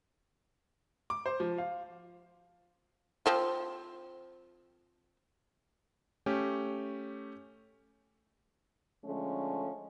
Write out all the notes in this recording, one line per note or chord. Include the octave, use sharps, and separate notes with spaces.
D6
C5
F3
F5
F3 C4 F4
A3 C#4 G4
D3 F3 G#3 A3 C#4